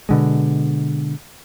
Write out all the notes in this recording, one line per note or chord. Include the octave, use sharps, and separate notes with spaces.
B2 D3 G#3